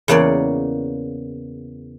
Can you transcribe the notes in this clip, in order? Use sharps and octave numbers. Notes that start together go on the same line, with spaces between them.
E2 C#3 A#3 C#5 D5